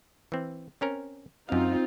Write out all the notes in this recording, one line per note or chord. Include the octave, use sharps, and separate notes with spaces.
E3 C4
C4 C#4 A#4
F#2 C4 D#4 F4 F5